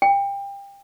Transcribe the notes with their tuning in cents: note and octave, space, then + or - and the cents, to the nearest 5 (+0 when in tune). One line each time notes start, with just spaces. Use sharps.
G5 +25